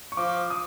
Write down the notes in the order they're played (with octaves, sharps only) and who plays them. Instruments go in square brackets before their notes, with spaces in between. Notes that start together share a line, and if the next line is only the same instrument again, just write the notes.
[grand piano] C#6
[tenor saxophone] F3 [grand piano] D6
[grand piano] D#6